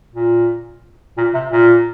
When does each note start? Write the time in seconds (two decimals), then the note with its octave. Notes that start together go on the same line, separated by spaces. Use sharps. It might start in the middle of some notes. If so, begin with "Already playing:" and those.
0.14 A#2
1.18 A#2
1.34 C3
1.52 A#2